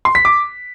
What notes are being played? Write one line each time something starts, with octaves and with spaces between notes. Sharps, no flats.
C6
B6
D6